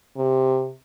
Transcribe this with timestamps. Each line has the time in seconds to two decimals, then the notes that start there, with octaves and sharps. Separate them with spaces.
0.17 C3